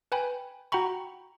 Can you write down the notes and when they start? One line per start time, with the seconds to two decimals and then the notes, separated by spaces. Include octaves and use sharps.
0.12 B4 G5 G#5 B5
0.72 F#4 F#5 G5 A#5 B5 C#6